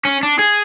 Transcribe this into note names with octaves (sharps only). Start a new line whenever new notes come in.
C#4
D4
G#4